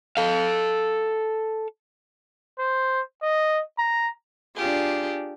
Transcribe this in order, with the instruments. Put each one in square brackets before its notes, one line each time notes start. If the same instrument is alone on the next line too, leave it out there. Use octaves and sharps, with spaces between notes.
[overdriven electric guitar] A4 F5
[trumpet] C5
D#5
A#5
[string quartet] D4 F4 G4 G#4